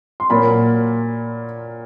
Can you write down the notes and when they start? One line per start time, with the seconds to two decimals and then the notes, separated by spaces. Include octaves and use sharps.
0.20 C6
0.30 A#2 F#3 A#3 B5